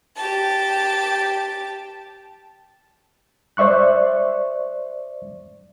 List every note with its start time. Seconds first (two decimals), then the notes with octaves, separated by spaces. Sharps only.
0.16 G4 A5
3.57 C5 D5 E5 C#6 F#6